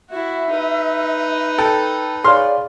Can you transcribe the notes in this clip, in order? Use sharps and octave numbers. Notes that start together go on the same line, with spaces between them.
E4 F#4 E5
D#4 B4
A4 G5
G#4 C#5 D5 F5 C6 F6